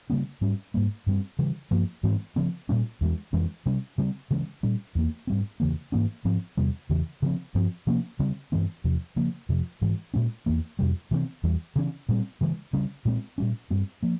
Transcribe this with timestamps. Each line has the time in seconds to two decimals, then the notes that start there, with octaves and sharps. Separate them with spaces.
0.10 C#3 G3 A#3 C#4
0.41 G#2 G3 C#4
0.74 G#2 G3 A#3
1.07 G2 G3 C4
1.39 C#3 E3 G3
1.71 G2 F3 A#3
2.03 G#2 E3 G#3 C4
2.36 C#3 F3 C4
2.69 A#2 G3 C#4
3.01 E2 E3 G#3
3.33 F2 E3 G#3 C#4
3.66 C3 G3 C#4
3.98 C#3 G3 C4
4.31 C#3 E3 G#3 C#4
4.63 A#2 G3 C#4
4.95 E2 E3 A#3
5.27 G#2 G3 C4
5.60 E2 C#3 E3 A#3
5.92 G#2 E3 A#3 C#4
6.25 G#2 F3 C4
6.57 E2 C3 G3
6.89 E2 C#3 E3
7.22 C#3 F3 C4
7.55 G2 F3 C4
7.87 C3 F3 A#3 C#4
8.19 C#3 G3 C4
8.52 G2 E3 G#3 C4
8.84 E2 C3 F3
9.16 C#3 F3 A#3
9.49 F2 C3 F3
9.81 G#2 E3 G#3
10.14 A#2 G#3 C#4
10.46 E2 E3 A#3
10.79 F2 C3 G3
11.11 C3 E3 G#3 C4
11.43 E2 E3 G3
11.76 C#3 E3 G#3 C#4
12.09 A#2 G3 C4
12.41 C#3 E3 G#3
12.73 C#3 G3 C#4
13.05 A#2 G#3 C4
13.38 A#2 G3 C#4
13.70 G2 G3 C4
14.03 F3 A#3